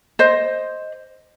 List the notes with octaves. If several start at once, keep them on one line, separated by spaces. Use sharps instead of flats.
C5 D#5